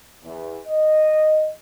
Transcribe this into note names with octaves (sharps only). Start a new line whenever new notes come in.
E2
D#5